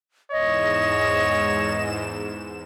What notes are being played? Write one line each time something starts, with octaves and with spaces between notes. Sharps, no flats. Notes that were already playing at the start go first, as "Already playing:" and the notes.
E2 G#2 C#5 D#5 E7